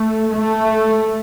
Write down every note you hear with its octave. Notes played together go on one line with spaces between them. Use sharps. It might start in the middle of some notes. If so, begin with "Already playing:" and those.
Already playing: A3
A3